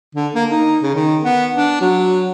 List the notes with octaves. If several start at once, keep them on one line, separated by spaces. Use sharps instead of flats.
D3
A#3
D#4
C#3
D#3
B3
D4
F#3